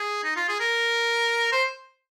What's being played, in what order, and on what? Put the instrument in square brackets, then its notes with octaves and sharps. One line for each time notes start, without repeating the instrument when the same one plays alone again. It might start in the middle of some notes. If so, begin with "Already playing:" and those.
Already playing: [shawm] G#4
D#4
F4
G#4
A#4
C5